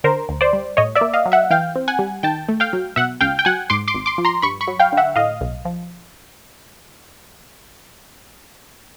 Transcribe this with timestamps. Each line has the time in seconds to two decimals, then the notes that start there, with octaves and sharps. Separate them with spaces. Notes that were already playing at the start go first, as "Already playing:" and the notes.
0.04 D3 A#4 C5
0.29 D2
0.41 C5 D5
0.53 G3
0.77 A2 C#5 D#5
0.95 D5 E5
1.01 A#3
1.13 D#5 F5
1.26 F#3
1.32 E5 F#5
1.50 E3 F5 G5
1.76 C4
1.88 F#5 G#5
1.99 G3
2.23 D#3 G5 A5
2.49 A3
2.60 F5 G5
2.73 F#3
2.96 B2 E5 F#5
3.21 C#2 F5 G5
3.39 G5
3.45 F#3 F#5 G#5
3.70 G#2 C6 D6
3.88 C6 D6
3.94 G#1
4.06 C6 D6
4.18 F3
4.25 A#5 C6
4.42 G2 B5 C#6
4.61 B5 C#6
4.67 F#3
4.80 F5 G5
4.92 D3
4.97 E5 F#5
5.16 A2 D#5 F5
5.41 B1
5.65 F3